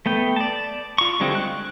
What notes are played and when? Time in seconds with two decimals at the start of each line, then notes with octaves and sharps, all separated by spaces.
0.06 A3 B3 G5
0.36 D5 A5
0.98 F4 C#6
1.20 D3 G3 G#3 C4 F4
1.35 F#6